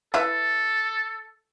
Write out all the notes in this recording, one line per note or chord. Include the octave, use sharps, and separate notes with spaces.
E4 A4 B4 E5